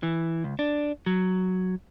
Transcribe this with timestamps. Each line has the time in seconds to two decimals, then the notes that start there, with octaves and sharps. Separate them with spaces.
0.03 E3
0.44 C#2
0.59 D4
1.06 F#3